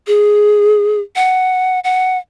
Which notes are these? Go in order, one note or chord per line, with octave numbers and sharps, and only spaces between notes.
G#4
F#5
F#5